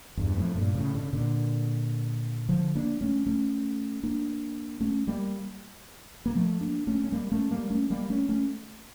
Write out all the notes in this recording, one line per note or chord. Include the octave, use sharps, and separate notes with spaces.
E2 G2
F2 A2
G2 A#2
A2 C#3
D3
C#3
A#2 D3
D3 F3
A#3 D4
A3 C#4
A3 C#4
A#3 D4
A3 C#4
G3 A#3
A#3
F3 A3
A#3 D4
A3 C#4
C#4
G3 A#3
A3 C#4
G3 A#3
A3 C#4
G3 A#3
A3 C#4
A3 C#4